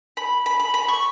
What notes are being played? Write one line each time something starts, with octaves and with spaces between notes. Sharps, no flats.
B5
B5
B5
B5
C#6